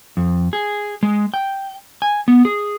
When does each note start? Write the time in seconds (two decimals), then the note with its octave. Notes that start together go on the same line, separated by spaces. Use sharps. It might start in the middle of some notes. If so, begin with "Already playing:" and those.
0.17 F2
0.53 G#4
1.03 G#3
1.34 G5
2.02 G#5
2.28 B3
2.45 G#4